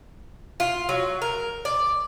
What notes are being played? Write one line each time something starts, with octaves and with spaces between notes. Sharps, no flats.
F4
F#3
A#4
D5